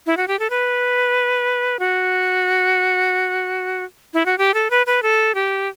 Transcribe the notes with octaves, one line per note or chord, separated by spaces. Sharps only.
E4
F#4
G4
A4
B4
F#4
E4
F#4
G4
A4
B4
B4
A4
G4